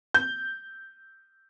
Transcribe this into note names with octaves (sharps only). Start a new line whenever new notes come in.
G6